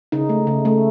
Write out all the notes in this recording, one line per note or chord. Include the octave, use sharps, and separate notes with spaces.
C#3 D#4
A3
C#3
A3